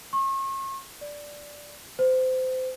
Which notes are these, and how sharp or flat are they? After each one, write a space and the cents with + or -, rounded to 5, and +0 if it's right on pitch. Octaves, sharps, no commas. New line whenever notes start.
C#6 -40
D5 -5
C5 -25